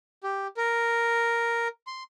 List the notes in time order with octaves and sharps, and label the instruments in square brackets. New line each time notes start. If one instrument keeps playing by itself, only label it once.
[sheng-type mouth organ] G4
A#4
C6